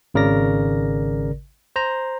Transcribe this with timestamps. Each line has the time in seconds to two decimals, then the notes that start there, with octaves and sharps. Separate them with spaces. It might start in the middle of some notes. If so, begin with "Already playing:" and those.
0.14 G#1 C#3 A#4 D5 A#6
1.76 C5 A#5